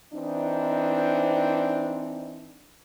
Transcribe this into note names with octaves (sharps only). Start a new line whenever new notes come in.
E3 C4 D4 D#4